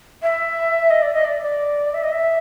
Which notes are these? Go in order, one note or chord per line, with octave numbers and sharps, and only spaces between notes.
E5
D#5
D5
D#5
D5
D5
E5
D#5
E5